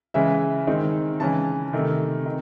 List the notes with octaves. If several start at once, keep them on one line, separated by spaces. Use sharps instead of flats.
C#3 E3 G#3 C#4 E5
D#3 G#3 C4 D#4
C#3 E3 G#3 C#4 A5
C3 D#3 A3
D#3